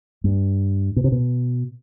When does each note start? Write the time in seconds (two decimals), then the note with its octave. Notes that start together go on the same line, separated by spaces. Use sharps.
0.24 G2
0.96 B2
1.04 C3
1.12 B2